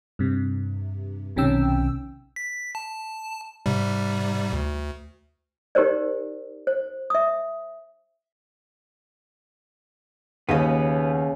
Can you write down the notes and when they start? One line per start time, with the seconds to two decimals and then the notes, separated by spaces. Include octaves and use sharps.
0.19 G2 C3
1.36 B1 C3 D#3 C#4 G5 E6
2.36 B6
2.75 A5
3.66 G#2 C3 G3
4.53 D2
5.75 D#4 G4 A#4 C5 D5
6.67 C5
7.10 E5 D#6
10.49 D#2 C#3 B3 D#5 F5